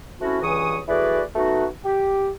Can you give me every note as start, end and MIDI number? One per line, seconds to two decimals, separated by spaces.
0.21 0.39 57
0.21 0.39 60
0.21 0.39 61
0.21 0.39 64
0.21 0.39 66
0.42 0.78 37
0.42 0.78 43
0.42 0.78 52
0.42 0.78 73
0.42 0.78 85
0.42 0.78 87
0.88 1.22 52
0.88 1.22 57
0.88 1.22 66
0.88 1.22 68
0.88 1.22 71
0.88 1.22 74
1.35 1.66 57
1.35 1.66 59
1.35 1.66 63
1.35 1.66 66
1.85 2.29 67